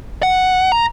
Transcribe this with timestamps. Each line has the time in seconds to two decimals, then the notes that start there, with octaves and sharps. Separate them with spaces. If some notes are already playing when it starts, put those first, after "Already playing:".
0.23 F#5
0.72 A#5